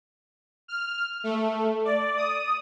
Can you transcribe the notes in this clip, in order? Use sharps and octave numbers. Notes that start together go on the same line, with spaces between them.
F6
A3
D5
D#6